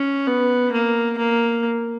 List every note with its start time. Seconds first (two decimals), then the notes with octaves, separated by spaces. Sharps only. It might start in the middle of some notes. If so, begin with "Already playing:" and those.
Already playing: C#4
0.27 B3
0.72 A#3
1.18 A#3